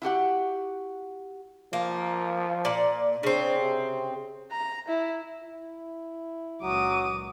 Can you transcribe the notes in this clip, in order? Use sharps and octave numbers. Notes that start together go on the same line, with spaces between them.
E4 F#4 G4 F#5
F3 A#3
A#2 D5
C#3 C4 D4
C3
A#5
E4
E4
C#2 A#2 F#3 D6 D#6